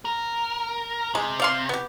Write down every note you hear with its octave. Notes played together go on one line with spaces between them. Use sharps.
A#4
C3 G#3
D5 F5 C6
B3 G4